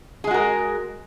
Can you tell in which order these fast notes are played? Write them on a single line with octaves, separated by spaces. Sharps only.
G#4 G#3 F#4 A#4